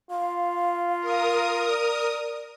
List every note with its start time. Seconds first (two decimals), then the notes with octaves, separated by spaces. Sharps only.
0.11 F4 F5
1.00 A#4 D#6
1.67 D5